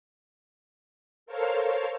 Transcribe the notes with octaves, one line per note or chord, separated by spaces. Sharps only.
A4 A#4 C5 C#5 F5